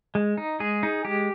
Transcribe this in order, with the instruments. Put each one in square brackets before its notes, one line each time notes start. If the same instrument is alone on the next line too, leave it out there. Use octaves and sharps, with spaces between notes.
[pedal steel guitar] G#3
D#4
G#3 G#4
D#4
G#3 G4